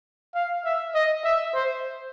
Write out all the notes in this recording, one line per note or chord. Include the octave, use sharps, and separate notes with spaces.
F5
E5
D#5
E5
C5